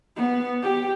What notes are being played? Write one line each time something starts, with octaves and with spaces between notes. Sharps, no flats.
B3
G4